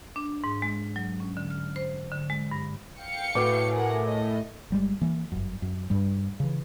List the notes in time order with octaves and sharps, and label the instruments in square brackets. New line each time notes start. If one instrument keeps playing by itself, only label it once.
[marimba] D4
G#2
G#3
F#3
C#4
D3
F6
C5
D3
G#3
G2
[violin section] F5 G5 C#7
[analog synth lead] A2 [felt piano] F#4 B4 D6
[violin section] G#4 A#4 F#5
D#5
[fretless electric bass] G1 G3 G#3
E3 A#3
G1 F#2
F#2
G2 G3
C#3 E3